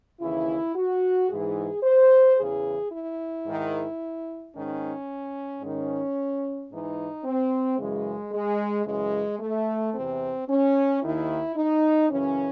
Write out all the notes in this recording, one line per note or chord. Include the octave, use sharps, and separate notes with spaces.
D#2 C#3 E3 E4
F#4
G#2 E3 G#4
C5
E2 C#3 E3 G#4
E4
G#2 D#3
G#2 D#3 C#4
G#2 D#3 C#4
G#2 E3 D#4
C4
F#2 C#3 E3 G#3
G#3
F#2 C#3 E3 G#3
A3
E2 C3 E3 C4
C#4
D#2 D#3 E4
D#4
F#2 C#3 E3 C#4